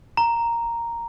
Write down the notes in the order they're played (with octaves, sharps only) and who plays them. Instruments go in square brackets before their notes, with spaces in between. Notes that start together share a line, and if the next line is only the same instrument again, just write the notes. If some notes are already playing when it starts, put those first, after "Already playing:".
[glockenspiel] A#5